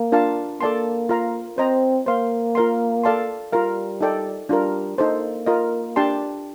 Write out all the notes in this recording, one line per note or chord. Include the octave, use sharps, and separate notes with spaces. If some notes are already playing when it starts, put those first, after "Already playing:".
Already playing: A#3
D4 F4 A#4 F5 A5
A#3 A4 D5 A5 C6
F4 A#4 F5 A#5
C4 C5 D#5 A#5
A#3 C5 F5 C6
F4 A#4 F5 C6
A4 D5 F5 A5 C6
G3 F4 A#4 F5
D#4 A4 D5 G5
G3 D4 F4 A#4
A#3 D#4 A4 C5
F4 A#4 D#5
D4 G4 D5 A5 C6